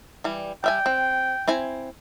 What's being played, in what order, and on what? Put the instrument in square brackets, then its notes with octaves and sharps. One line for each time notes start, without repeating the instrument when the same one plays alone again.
[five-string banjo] E3 G3
[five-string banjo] G3 E5 G#5 [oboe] G5
[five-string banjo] C4
C4 E4 G#5